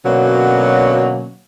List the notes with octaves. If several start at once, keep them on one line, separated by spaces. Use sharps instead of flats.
B2 D3 F#3 A#3 C#4